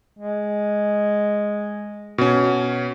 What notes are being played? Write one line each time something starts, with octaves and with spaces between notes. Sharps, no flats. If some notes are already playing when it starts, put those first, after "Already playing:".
G#3
B2 C#4